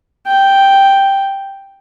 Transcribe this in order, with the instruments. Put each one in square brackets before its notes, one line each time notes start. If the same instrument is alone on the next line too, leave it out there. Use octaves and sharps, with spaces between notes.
[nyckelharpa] G5